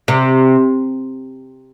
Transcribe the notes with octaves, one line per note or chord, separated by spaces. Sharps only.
C3